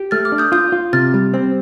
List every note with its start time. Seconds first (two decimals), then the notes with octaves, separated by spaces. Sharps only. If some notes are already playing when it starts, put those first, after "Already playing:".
Already playing: G4
0.11 A3 F6 A6
0.25 D6 F6
0.32 D4
0.38 D#6 G6
0.52 F4 D#6 G6
0.72 F4
0.93 C3 F6 A6
1.14 G3
1.34 C4